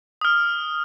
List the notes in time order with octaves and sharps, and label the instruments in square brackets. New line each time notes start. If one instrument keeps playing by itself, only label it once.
[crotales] D#6 F6